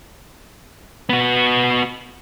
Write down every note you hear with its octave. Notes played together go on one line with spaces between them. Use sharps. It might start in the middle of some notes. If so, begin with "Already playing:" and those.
B3 F#4